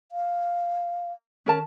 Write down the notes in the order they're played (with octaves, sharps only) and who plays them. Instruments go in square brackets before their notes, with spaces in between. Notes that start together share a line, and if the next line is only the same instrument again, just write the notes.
[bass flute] F5
[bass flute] D#3 [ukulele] C#4 A#4 A5